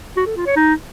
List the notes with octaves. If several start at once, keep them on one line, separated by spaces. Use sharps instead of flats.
F#4
A4
F4
C#5
D#4